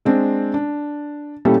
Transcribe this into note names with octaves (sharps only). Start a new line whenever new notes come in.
G#3 C4 D4
D4
A#2 G3 C#4 E4 G4 A4